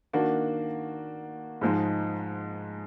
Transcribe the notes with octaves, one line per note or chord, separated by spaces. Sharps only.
D#3 A#3 D4 F#4
G#2 F3 G#3 D#4